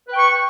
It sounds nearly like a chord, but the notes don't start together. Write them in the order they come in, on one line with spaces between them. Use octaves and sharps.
B4 G5 C#6